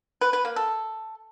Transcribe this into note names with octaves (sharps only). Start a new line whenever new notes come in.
B4
B4
A#3
A4